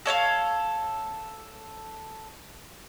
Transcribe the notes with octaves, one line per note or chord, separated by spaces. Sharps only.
A4 C#5 D#5 F5